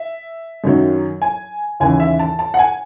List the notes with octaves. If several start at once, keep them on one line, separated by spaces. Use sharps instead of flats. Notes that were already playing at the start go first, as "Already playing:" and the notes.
Already playing: E5
F#2 D#3 F#3
G#5
D#2 C#3 E3 G#5
E5
A5
A5
F#5
G#5